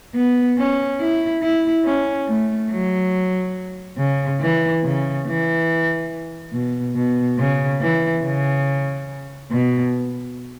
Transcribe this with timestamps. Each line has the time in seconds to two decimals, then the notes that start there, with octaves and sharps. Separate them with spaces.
0.15 B3
0.57 C#4
1.00 E4
1.42 E4
1.85 C#4
2.27 A3
2.70 F#3
3.97 C#3
4.40 E3
4.83 C#3
5.26 E3
6.53 B2
6.95 B2
7.38 C#3
7.80 E3
8.23 C#3
9.51 B2